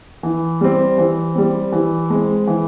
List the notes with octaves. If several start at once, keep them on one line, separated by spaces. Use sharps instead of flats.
E3
G3 C4
E3
G3 C4
E3
G#3 C4
E3